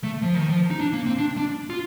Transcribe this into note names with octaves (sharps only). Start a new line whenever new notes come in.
A3
F3
D#3
F3
D#4
D4
A#3
C4
D4
D4
F4